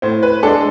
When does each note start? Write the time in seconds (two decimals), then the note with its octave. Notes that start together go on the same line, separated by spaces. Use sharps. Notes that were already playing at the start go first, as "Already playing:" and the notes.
0.02 A2 C5
0.23 B4
0.43 G#3 D4 A4